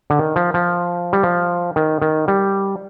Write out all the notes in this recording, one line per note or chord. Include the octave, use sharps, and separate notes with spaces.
D3
D#3
F3
F3
G3
F3
D#3
D#3
G3